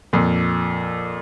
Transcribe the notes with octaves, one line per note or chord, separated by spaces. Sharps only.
F2 A#2